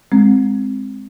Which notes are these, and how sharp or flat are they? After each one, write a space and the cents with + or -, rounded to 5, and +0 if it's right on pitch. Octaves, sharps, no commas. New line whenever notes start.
G#3 +0 C4 +0